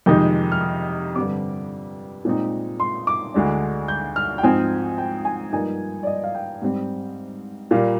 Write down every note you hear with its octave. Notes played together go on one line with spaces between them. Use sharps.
F2 C3 D#3 G#3 D#4 G6
F6
D#6
G2 D3 G3 C4 D6
A#2 G#3 C4 D#4
C6
D6
D2 D3 G#3 D4
G6
F6
G5
G#2 F3 C4 D#4 G#5
G5
G#5
G2 F3 A#3 D#4 G#5
D5
D#5
F5
G5
G#2 G3 C4
A#2 G3 A#3 F5